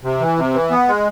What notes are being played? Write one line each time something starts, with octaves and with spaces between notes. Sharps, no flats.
C3
E3
C3
E3
B3
G#3